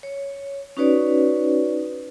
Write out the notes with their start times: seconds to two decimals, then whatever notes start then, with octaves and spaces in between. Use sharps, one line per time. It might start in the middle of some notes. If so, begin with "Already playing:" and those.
0.03 C#5
0.77 C#4 D#4 F#4 B4 C#5 D5